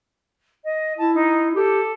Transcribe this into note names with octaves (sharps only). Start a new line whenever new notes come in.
D#5
E4 A5
D#4
G4 A4